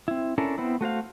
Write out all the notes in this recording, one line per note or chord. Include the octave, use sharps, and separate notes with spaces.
C4 E4
C#4 D4 E4 A4 A#4
B3 C4 E4
A3 F#4 C5 F5